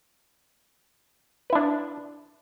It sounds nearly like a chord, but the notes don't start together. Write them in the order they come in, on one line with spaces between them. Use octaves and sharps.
B4 E4 D4